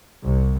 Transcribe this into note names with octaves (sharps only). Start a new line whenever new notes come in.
C2